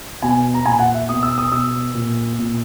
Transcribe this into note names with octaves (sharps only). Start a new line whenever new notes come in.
B2 G#5
A#5
A#2 G#5
F#5
E5
B2 D#6
E6
D#6
B2 E6
A#2
A#2